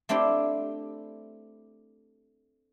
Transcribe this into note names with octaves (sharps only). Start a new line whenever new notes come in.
A3 C4 D4 E4 G4